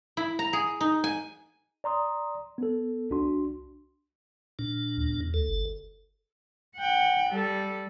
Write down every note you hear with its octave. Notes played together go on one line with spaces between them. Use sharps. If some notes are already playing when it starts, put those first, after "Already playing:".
E4
A#5
G#4
D#4
G#5
D5 A#5 C6 D#6
B3 A4
C2 D4 F#4 C6
A#2 D4
D#2
E2
D2 A4
G1
F#5 G5
G3 A4